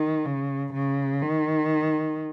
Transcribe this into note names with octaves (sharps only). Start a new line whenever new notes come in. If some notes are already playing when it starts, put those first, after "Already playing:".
Already playing: D#3
C#3
C#3
D#3